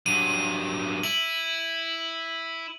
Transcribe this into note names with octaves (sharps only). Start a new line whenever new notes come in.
G2 F#3 D#7
E4 F#7